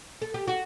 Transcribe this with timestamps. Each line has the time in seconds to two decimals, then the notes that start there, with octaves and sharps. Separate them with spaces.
0.22 A4
0.34 G4
0.48 F#4